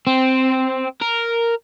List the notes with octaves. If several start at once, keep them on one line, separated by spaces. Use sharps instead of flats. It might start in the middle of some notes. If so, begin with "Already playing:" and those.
C4
A#4